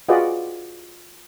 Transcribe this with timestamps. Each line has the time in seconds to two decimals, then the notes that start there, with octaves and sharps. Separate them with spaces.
0.09 F4 F#4 G#4 B4 D5 D#5